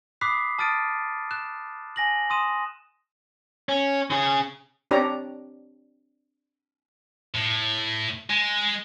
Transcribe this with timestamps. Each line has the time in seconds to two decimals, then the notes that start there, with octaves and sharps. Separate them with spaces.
0.21 B5 D6 D#6 F#6 B6 C7
0.59 A5 D#6 F6 A6 D7 D#7
1.31 F#6 E7
1.96 G#5 A#6 F#7
2.30 C6 D#6 D#7 E7
3.69 C#4
4.10 C#3 G#4
4.91 C4 D4 G4 C#5 D5 A#5
7.35 A2
8.30 G#3